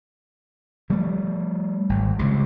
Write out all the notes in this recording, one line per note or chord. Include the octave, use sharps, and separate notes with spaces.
F3 G3 A3
G#1
C#2 C3